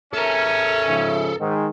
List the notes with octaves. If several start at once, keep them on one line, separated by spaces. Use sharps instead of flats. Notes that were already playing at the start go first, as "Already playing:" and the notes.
C#4 A4 A#4 E5
G#2 C#3 F3
G#2 D#3